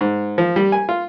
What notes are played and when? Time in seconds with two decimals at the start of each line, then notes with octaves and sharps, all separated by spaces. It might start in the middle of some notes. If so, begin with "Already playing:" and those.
0.01 G#2
0.38 F3
0.56 G3
0.72 G#5
0.89 F4